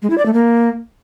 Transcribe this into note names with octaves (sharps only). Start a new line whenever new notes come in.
G#3
E4
D5
A3
A#3